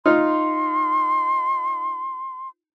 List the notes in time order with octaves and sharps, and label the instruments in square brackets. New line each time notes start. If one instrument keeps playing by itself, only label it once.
[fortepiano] D#4 F4 F6 [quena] C6